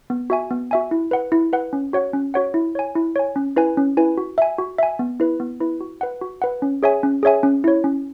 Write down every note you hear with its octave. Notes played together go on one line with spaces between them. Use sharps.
B3
F#4 E5 G#5
B3
F#4 E5 G#5
E4
B4 F#5
E4
B4 F#5
C#4
F#4 C#5 F#5
C#4
F#4 C#5 F#5
E4
C#5 G#5
E4
C#5 G#5
C#4
E4 B4 G#5
C#4
E4 B4 G#5
F#4
E5 G#5
F#4
E5 G#5
B3
E4 B4
B3
E4 B4
F#4
B4 F#5
F#4
B4 F#5
C#4
G#4 C#5 E5 G#5
C#4
G#4 C#5 E5 G#5
C#4
E4 C#5
C#4